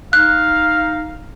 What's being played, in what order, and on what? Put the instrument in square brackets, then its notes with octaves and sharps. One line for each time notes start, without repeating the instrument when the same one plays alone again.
[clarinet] D#4 [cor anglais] F5 [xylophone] F#6